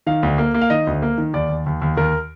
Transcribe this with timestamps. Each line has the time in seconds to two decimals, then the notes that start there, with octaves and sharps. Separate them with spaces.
0.07 D#3 F5
0.23 D2
0.38 A#3
0.54 A#3
0.61 F5
0.70 D#3 D#5
0.87 D2
1.02 A#3
1.18 D#3
1.34 D#2 D5
1.49 D#2
1.66 D#2
1.82 D#2
1.97 D#2 A#4